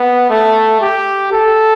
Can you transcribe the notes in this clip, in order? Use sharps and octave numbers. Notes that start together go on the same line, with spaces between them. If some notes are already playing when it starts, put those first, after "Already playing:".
Already playing: B3
A3
G4
A4